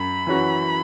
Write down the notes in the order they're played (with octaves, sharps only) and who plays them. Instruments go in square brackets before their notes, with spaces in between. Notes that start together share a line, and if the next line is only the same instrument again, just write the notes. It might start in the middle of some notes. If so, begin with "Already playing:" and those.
Already playing: [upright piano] F#2 [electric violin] B5
[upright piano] E3 C#4 F#4